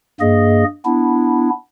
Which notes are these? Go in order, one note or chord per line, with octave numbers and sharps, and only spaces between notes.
G2 A#3 G#4 D#5
B3 D4 E4